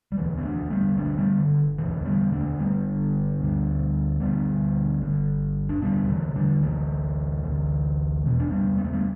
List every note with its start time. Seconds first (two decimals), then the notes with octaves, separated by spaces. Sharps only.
0.12 G3
0.17 E1 D2 D3 E3
0.37 B3
0.44 A3 D4
0.70 G3 B3
0.97 G1 G2 D3 A3 D4
1.17 G3 B3
1.39 D3
1.78 E1 D2 D3 E3 A3
2.05 G3 B3
2.32 A3 D4
2.58 G1 G2 D3 G3 B3
3.39 D2 D3
4.20 D2 D3 G3 B3
5.01 G1 G2 D3
5.69 D4
5.82 E1 D2 D3 G3 B3
6.09 E3 A3
6.35 D3 G3
6.62 D2 D3 E3 A3
7.44 D2 D3
8.24 E1 E2 B2
8.40 D4
8.50 G3 B3
8.78 B3
8.84 A3
8.92 G3 B3